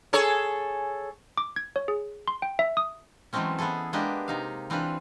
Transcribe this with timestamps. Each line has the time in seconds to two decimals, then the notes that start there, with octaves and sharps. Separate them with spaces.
0.13 G#4 A4 C#5
1.38 D6
1.56 G#6
1.76 C#5
1.88 G#4
2.28 C6
2.42 G5
2.59 E5
2.77 D#6
3.33 E3 F#3 G#3 A3 C4 C#4
3.59 B3 E4 G#4 A4
3.93 G#3 A#3 B3 D4 G4 D#5
4.28 C3 D#4 F5
4.70 E3 C4 D4 F4 B4